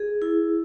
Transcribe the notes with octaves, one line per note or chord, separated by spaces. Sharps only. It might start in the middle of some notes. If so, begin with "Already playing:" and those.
Already playing: G#4
E4